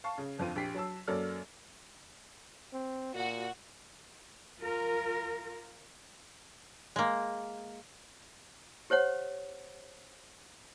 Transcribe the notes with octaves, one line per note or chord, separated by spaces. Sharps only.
F5 A5 C#6
C#3
G1 F2 C4 F4 D#7
A#1 G4 B6 C7
F#3 A5 E6
F#2 F#3 A#3 A4 D5 F6
C4
A#2 F#4
F4 A#4
G#3 A#3
G4 C5 C#5 F#5